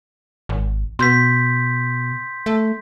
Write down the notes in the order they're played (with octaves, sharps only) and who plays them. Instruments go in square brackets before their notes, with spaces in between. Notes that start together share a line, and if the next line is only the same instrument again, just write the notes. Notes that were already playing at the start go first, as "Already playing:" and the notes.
[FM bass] G#1
[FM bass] B2 [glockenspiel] C6 G6 B6
[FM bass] A3